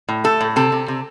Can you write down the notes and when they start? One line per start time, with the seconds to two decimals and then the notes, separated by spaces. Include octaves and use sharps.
0.09 A2
0.24 A3 A4
0.41 A2
0.56 C3 A4
0.72 C3
0.88 C3